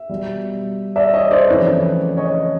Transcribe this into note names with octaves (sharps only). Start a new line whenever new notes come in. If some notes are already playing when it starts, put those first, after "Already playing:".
Already playing: E5
B2 G3
D5 E5
C#5 D#5
C5 D5
F2 C#3 E3 A3 B4 C#5
C#5 D#5